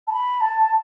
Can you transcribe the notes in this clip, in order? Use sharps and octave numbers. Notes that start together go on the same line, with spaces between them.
A5
B5
A5